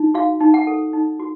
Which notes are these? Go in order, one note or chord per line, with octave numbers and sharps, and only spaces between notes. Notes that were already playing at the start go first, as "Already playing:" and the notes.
Already playing: D#4
F#4 F5
D#4
F#5
A4
D#4
F#4